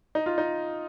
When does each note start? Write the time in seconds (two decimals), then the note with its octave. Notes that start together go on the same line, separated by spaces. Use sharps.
0.15 D#4
0.26 F4
0.38 D#4